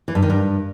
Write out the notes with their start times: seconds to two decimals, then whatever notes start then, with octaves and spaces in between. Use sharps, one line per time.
0.08 E3
0.15 G2
0.22 D#3
0.30 G2